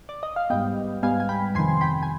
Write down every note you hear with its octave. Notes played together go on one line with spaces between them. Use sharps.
D5
D#5
F5
G#2 G3 B3 D#5 G5
G#2 G3 B3 F5 G#5
G#5
G5 B5
F2 C3 D#3 G#5 C6
G5 B5
G#5